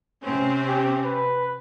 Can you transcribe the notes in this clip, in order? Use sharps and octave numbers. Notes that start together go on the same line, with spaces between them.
C3 C4 C#4
G4
B4